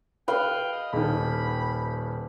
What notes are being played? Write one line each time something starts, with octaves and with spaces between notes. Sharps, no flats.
B4 F5 G5
D#5
D#1 D#3 B5